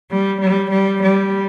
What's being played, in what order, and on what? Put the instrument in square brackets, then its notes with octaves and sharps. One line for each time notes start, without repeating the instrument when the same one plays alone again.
[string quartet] G3
G3
G3
G3